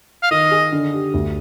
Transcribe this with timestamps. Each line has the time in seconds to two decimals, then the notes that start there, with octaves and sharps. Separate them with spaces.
0.22 F5
0.31 D#3 D#5
0.51 G#4
0.72 D3
0.93 G4
1.14 D2